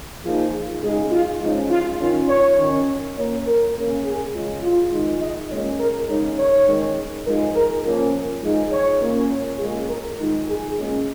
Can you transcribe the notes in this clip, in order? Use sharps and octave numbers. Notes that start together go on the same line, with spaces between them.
F3 A#3 D#4 G#4
C#3 G#3 D#4 G#4
F4
F3 G#3 C#4 D#4
F4
D#3 C#4 F4
C#5
D#3 C#4
A#2 A#3 C#4 C#5
A#4
C#3 A#3 C#4
G#4
C#3 G#3 C#4 F4
F4
D#3 G#3 D#4
D#5
A#2 G#3 C#4 C#5
A#4
C#3 G#3 D#4 C#5
C#5
D#3 G#3 C#4
F3 G#3 D#4 A#4
A#4
A#2 F3 A#3 C#4
F3 G#3 D#4 G#4
C#5
A#2 A#3 C#4
C#5
A#2 G#3 C#4 G#4
A#4
D#3 G#3 D#4 F4
G#4
A#2 G#3 C#4